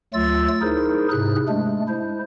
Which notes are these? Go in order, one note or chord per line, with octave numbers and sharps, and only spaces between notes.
D2 F#3 A3 F4 E6 A6
D#4 E4 G#4 A#4 C5
G#2 C3 G#4 F#6
G#3 A3 D4
E4 C5